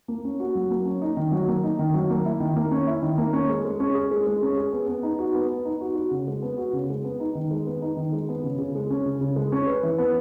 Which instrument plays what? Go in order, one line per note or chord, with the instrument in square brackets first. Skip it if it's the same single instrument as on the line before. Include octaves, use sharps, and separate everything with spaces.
[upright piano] A#3
C#4
F#4
F#3
A#3
C#4
D#4
D#3
F#3
A#3
D#4
D#3
F#3
A#3
E4
D#3
A#3
C#4
E4
D#3
A#3
C#4
G#3
G#3
C#4
G#4
G#3
G#3
C#4
G#4
B3
B3
D#4
F#4
B3
B3
D#4
F#4
F#4
C#3
G#3
B3
F#4
C#3
G#3
B3
D#4
D#3
G#3
B3
D#4
D#3
G#3
B3
C#3
C#3
G#3
C#4
C#3
C#3
G#3
C#4
B4
E3
B3